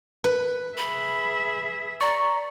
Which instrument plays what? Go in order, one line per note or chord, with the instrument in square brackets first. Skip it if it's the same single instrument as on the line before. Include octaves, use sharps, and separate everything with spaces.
[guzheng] B4
[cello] G#4 E5 [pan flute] B5
[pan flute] D5 [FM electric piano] A#5 C#6